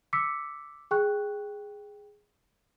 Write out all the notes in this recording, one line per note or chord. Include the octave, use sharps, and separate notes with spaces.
D6 E6 B6 C#7
G#4 G5 C#6 F#6